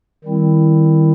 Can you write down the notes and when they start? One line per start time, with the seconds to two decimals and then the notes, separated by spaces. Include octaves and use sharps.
0.25 D#3 G3 C4 E4